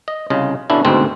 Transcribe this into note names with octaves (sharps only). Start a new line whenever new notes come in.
D#5
C2 C#3 F4 D#5
B2 D3 B3 C#4 D4 E4
D2 G#2 B2 G#3 C4